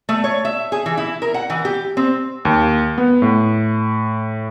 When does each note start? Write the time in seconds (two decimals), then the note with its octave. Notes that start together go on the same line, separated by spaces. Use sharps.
0.09 A3
0.24 C#5
0.45 E5
0.72 G#4
0.86 E3
0.97 E4
1.22 A#4
1.34 F#5
1.50 E3
1.65 G4
1.97 C4
2.45 D#2
2.98 B3
3.22 A2